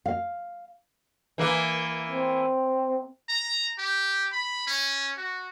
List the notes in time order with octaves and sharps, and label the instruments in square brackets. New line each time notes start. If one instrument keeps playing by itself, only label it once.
[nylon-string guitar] F5
[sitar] E3 A#3
[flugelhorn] C4
[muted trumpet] A#5
G4
B5
C#4
F#4